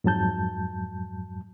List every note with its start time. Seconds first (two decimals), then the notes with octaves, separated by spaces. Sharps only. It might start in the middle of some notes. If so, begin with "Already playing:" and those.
0.04 F2 G#2 F#3 A5 G6